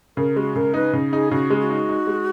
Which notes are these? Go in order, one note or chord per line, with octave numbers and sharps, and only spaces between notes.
C#3 A#4
G#3 F#4
C#3 A#4
D#4 B4
C#3
D#4 G#4
C#3 F#4
G#3
F#4
D#4
D#4
G#3